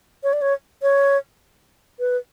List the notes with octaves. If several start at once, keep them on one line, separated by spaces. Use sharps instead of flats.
C#5
D5
C#5
C#5
B4